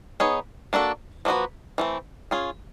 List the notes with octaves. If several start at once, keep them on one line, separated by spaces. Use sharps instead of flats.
B3 D#4 G#4 C#5
A#3 D4 F#4 A4
F3 A#3 D#4 F#4 B4
E3 A3 C4
C#4 F4 G#4